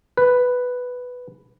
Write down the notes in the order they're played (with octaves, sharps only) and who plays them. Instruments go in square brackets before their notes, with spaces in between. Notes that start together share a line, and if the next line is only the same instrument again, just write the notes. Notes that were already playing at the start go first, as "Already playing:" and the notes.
[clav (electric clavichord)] B4